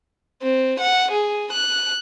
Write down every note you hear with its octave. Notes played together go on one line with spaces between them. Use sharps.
C4
F#5
G#4
F#6